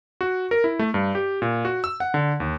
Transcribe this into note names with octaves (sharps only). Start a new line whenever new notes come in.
F#4
A#4
E4
A3
G2
G4
A#2
F#4
E6
F#5
D3
D#2